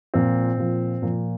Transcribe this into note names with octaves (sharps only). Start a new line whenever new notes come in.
A#2 F3 C4
A#2 F3
A#2 F3